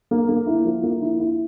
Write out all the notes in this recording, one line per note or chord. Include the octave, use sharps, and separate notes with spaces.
A#3
A#3
E4
F3
A#3
E4
E4